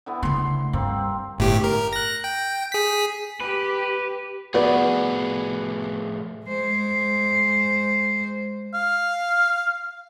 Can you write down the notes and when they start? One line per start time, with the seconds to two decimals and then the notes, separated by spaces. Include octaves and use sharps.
0.06 D3 E3 B3
0.23 C#3 A3 C6
0.73 G2 A#3 C4 G4
1.38 G1 A2 G4
1.64 A#4
1.93 F#6 A#6
2.24 G5
2.72 G#4 B6
3.40 G4 B4
4.54 A2 F3 B3 F#4 G#4 B4 D5
6.45 G#3 C5
8.74 F5